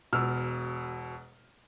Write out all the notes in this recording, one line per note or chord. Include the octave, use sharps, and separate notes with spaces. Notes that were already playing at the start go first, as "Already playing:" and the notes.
E1 B2 E6 F6